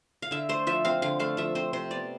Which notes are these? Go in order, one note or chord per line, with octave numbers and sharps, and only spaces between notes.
F5
D3 E5
A3 C5
F3 E5
C4 F5
D3 F5
A3 F5
F3 E5
C4 C5
C3 C5
B3 D5